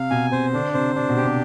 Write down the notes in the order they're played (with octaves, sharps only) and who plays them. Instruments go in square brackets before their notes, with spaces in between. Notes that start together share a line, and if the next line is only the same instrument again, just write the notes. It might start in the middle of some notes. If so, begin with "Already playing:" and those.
Already playing: [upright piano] C3 [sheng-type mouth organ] F5
[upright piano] B2 [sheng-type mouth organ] G#5
[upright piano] C3 [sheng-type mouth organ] C5
[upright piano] D3 [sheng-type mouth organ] D4
[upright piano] C3 [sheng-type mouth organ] C5
[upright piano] C3 [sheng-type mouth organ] D4
[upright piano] B2
[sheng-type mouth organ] G4
[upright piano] C3